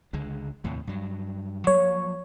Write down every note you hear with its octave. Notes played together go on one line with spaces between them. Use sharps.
C#2 D3 G#3
D#2 A2 C3
G2 F#3
F3 F#3 A#3 C#5